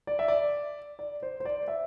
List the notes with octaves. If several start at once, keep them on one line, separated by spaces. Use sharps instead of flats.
D5
E5
D5
D5
C5
C5
D5
E5